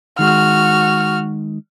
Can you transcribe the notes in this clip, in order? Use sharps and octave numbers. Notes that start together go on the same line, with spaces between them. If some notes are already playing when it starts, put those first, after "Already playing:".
D#3 G#3 F#4 F6